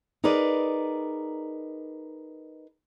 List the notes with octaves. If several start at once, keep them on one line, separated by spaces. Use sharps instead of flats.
D#4 G#4 A#4 B4 D5